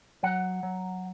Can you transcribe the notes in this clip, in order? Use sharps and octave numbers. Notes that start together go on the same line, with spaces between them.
F#3 F#5
F#3